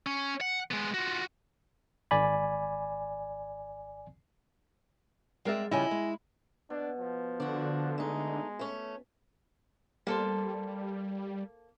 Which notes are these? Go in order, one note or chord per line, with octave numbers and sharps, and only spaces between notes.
C#4
F#5
G#3 B3
F4 F#4
G#1 D5 G#5 B5
G#3 C4 A#4 D5 E5
F2 C#3 G3 E4 D#5 G#5
G#3
B2 D4
F3
D3 D4 F#4
G#3 A3 D#4
A3 C#4
G3 A#3 A4 C5